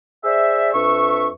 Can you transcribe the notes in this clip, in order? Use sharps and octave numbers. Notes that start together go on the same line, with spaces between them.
G#4 C5 D5 E5
F2 D4 B4 E5 C#6